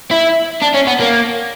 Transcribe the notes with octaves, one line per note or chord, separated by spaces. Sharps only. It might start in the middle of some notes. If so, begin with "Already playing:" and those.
E4
D4
C#4
B3
A#3